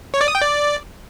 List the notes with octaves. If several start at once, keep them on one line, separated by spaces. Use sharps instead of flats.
C#5
D5
D#6
G5
D5